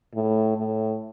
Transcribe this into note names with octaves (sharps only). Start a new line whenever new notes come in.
A2
A2